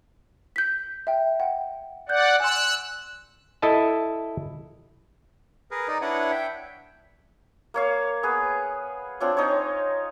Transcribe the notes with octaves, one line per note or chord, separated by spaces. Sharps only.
G6 B6
E5 G5
F#5 G5
D5 F#5 F#6 G6
G#5 C6 E6 F#6
E4 A4 D#5 A5
G#4 A#4 B4
D#4 D5 D#5
D4 E4 B4 C#5 F#5
E5 G5
A#3 C#5 F5
B3 G#4 B4
C4 D4 F4 C#5
D#4 C5 C#5